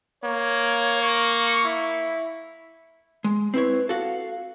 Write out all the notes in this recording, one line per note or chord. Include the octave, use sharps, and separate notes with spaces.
A#3 C#5
C#6
E4
G#3
C4 E4 B4 C#5
F#4 A4 F5